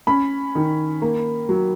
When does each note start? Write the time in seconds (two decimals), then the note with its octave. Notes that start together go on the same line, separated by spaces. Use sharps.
0.07 C#4 B5
0.55 D#3
1.02 A#3
1.49 F#3